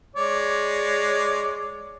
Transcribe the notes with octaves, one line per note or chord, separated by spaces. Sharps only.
G#3 C#5 D5